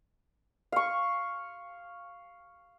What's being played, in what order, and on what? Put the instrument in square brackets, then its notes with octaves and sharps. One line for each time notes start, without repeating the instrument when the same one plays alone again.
[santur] F5 C#6